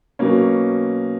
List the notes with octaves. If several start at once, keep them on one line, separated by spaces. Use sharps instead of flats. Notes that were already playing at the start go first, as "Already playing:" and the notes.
B2 F#3 A#3 C#4